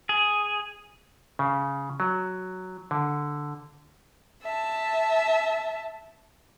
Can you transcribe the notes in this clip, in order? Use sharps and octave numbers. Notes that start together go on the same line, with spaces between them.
G#4
C#3
F#3
D3
E5 A5